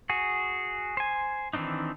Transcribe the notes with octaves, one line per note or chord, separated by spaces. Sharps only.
F#4 G#4
C5 G#5
D#3 E3 C4 D4 D#4